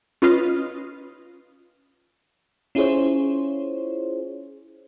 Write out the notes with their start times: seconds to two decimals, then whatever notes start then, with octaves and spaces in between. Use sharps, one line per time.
0.22 C#4 F4 B4 D#5 F5
2.75 C#4 E4 F4 G#4 C5 C#5